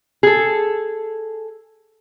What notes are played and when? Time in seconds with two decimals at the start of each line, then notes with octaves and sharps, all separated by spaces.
0.23 G#4 A4